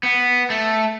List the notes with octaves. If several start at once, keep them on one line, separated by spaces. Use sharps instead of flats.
B3
A3